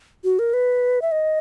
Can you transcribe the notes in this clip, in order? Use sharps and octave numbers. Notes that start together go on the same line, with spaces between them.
F#4
A#4
B4
E5
D#5